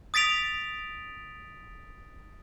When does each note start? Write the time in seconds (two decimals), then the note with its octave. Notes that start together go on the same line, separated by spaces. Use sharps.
0.14 D#6 A6 B6 D7 F7